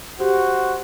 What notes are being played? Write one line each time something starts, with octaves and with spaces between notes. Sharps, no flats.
F#4 G4 C5